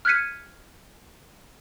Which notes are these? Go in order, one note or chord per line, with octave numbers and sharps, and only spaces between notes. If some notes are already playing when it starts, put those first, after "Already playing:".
F6 F#6 G#6 B6 C#7 D#7